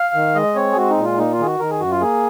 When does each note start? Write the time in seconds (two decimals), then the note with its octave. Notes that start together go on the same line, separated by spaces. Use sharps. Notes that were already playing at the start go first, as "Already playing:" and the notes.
Already playing: F5
0.14 D#3
0.35 G#3 D#5
0.56 C4 C#5
0.72 G#4
0.77 G#3 F#4
0.90 D#4
0.97 A#2
1.04 F4
1.18 A#3 D#4
1.32 F4
1.39 D#3 G#4
1.46 F#4
1.60 D#3 A#4
1.70 G#4
1.80 F#2 F#4
1.91 F4
2.01 A#3 G#4